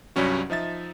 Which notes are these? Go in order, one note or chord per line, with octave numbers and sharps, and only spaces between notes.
C2 G2 F#3 G3 C#4 F#4
F3 D#4 E5 A6